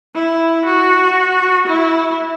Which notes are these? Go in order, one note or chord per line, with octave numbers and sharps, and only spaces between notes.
E4
F#4
E4